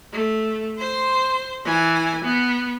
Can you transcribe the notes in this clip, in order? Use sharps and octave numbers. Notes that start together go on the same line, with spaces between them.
A3
C5 C6
E3 G#5
B3